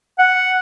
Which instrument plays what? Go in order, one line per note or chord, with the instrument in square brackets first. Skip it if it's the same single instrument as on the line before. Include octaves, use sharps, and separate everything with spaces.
[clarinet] F#5